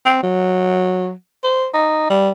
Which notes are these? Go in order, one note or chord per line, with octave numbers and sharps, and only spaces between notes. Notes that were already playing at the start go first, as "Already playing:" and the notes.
C4
F#3
C5
D#4
G3